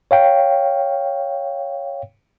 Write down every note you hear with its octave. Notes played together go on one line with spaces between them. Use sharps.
C#5 F5 G5